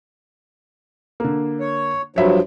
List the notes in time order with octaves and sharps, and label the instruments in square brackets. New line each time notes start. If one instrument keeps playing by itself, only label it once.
[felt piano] D3 A#3
[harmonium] C#5
[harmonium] G2 F3 F#3 [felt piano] C#5 E5 B5